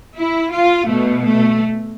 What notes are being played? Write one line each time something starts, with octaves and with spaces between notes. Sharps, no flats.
E4
F4
B2 A3
A3